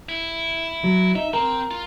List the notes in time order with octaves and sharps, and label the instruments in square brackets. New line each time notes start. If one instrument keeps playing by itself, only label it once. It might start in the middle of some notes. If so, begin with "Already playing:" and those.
[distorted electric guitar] E4
[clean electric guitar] F#3
[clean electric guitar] D#4 [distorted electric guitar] E5
[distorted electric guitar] C4 [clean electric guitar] A#4
[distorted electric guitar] F4